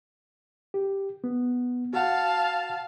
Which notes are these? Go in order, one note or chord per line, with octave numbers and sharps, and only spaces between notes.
G4
B3
F#4 F5 F#5 A5